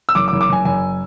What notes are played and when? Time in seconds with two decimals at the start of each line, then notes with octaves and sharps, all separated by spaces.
0.09 E6
0.15 F#1 D6
0.28 D6
0.32 F#1
0.41 D6
0.49 F#1 G#5
0.65 F#1 G#5